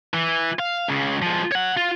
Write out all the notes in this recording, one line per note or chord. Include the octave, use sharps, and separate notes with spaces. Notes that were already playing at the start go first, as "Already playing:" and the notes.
E3
F5
C#2 C#3
F3 G#3
C#5 F#5
F4